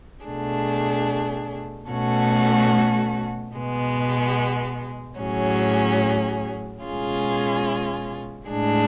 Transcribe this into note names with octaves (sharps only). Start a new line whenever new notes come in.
B2 A3 D4 G#4
B2 A3 C#4 F#4 A4
B2 G#3 B3
A2 F#3 C#4 G#4
B2 G#3 C#4 F4 G#4
A2 G#3 D4 G#4